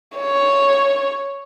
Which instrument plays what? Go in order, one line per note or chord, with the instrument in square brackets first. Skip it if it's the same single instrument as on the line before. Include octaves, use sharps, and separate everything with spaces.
[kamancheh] C#5